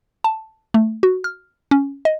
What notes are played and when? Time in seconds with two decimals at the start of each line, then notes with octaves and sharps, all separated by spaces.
0.24 A5
0.74 A3
1.03 F#4
1.24 F6
1.71 C#4
2.05 D#5